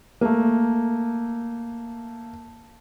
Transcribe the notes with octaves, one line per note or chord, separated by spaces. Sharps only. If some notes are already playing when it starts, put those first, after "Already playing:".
A3 A#3